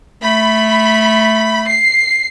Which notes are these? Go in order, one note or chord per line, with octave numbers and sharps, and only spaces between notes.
A3 B5
C7